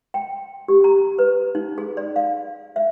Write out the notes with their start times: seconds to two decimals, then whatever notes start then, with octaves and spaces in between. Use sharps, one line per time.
0.14 G5
0.68 G4
0.84 A#5
1.19 B4
1.55 D#4
1.78 G#4
1.97 D5
2.16 F5
2.76 E5